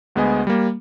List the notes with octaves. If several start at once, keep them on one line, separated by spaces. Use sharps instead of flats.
D2 G#3 B3 D#5 G#5
G3 A#3